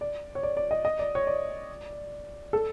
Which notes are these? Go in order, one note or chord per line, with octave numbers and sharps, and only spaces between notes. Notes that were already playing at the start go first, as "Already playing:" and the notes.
D5
C#5
D5
D5
D#5
D#5
D5
C#5
D5
A4